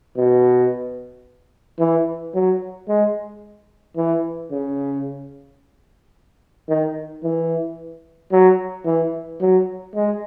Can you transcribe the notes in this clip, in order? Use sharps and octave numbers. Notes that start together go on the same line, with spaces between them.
B2
E3
F#3
G#3
E3
C#3
D#3
E3
F#3
E3
F#3
G#3